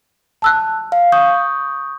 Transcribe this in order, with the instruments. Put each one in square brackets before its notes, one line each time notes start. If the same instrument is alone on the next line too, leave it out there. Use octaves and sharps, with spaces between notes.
[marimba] A5 E6 F#6
[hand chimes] F5
C#6 D#6 G6